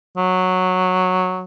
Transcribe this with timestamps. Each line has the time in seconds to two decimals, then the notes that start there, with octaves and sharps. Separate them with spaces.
0.17 F#3